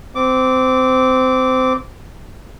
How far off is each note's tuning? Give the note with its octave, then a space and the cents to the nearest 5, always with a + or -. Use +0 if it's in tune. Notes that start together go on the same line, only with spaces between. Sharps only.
C4 -20 D6 -10